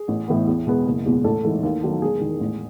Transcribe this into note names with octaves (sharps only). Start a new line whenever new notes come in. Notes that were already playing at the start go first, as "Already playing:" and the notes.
Already playing: G#4
A1
A2 E3 B3
E2
B2 G#3 B3
F#1
E2 B2 G#3
A1 A4
G#2 E3 A3
D#2
D#3 F#3 A3
E1 G#4
E2 D#3 G#3
A1